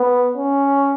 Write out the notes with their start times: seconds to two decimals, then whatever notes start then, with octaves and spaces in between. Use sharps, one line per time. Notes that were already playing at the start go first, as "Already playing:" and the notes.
Already playing: B3
0.37 C#4